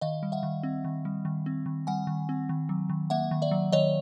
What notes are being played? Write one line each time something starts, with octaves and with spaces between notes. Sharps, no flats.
D#3 D#5 F5
G3
E5 F#5
D#3
C4
D#3
G3
D#3
C4
D#3
G3 F#5 G#5
D#3
C4
D#3
F#3
D#3
A#3 E5 F#5
D#3
D5 E5
F#3
D#3 C#5 D#5